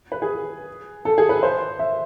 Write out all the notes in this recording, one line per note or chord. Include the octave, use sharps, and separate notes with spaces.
B4
G#4
A4
G#4
B4
C5
E5